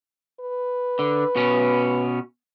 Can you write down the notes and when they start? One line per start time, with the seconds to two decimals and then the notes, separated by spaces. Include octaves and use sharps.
0.40 B4
0.99 D3
1.36 B2 C#4